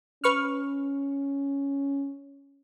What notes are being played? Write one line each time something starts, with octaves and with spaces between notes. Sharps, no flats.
C#4 B4 C#6 F6